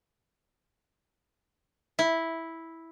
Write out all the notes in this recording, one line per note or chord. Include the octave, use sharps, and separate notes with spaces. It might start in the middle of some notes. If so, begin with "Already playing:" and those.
E4